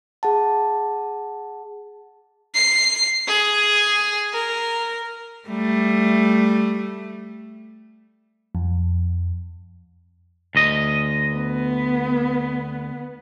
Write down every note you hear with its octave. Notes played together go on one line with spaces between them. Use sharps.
G#4 F#5 A5
C7
G#4
A#4
G3 A3
F2
D2 D#5
B3